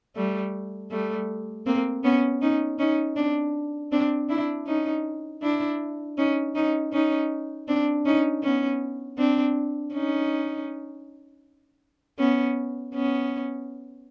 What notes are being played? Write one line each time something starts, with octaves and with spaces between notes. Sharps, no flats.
G3 A3
G3 A3
A#3 C4
B3 C#4
C#4 D#4
C#4 D#4
C4 D4
C4 D4
D4 E4
C#4 D#4
D4 E4
C#4 D#4
C#4 D#4
C#4 D#4
C4 D4
C#4 D#4
B3 C#4
C4 D4
C#4 D#4
B3 C#4
B3 C#4